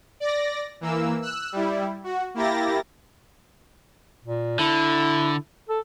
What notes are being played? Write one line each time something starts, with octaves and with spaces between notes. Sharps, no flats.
D5 A#6
E3 A#3 E6
E6 F#6
G3 E4
F#4
A#3 E4 G4 A6 A#6
A#2
D3 E4
A4